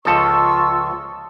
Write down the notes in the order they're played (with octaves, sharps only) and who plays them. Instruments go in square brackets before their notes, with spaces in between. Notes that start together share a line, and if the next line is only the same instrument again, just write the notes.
[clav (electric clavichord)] C#2 F3 A4 [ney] F4 [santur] D#5 A5 [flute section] C#6 E6